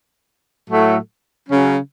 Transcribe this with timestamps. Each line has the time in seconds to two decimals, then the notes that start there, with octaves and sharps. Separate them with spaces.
0.68 A2 F#3 A3
1.48 C#3 F#3 C#4